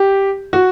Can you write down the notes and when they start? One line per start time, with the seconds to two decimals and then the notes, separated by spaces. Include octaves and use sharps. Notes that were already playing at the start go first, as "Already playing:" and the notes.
Already playing: G4
0.53 F#4